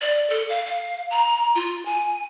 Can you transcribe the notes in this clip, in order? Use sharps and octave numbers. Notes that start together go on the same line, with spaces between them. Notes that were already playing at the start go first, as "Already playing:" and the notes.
D5
A4
F5
F5
A#5
F4
G#5